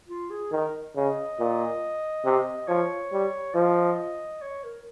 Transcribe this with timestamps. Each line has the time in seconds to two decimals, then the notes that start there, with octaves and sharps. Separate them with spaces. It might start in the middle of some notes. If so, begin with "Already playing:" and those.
0.08 F4
0.30 G#4
0.52 D#3 A#4
0.96 C#3 D#5
1.39 A#2
2.25 C3
2.68 F3 C#5
3.12 G3
3.55 F3 D#5
4.42 C#5
4.64 A#4